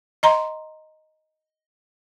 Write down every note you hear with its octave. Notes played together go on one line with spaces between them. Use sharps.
D#5 A#5 C6